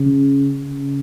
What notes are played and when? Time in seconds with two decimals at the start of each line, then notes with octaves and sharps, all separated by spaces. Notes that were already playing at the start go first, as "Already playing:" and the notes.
Already playing: C#3
0.64 C#3